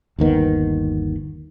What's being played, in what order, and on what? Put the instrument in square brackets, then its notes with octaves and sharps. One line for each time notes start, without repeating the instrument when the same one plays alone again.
[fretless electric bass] G1 D#2 D#3 B3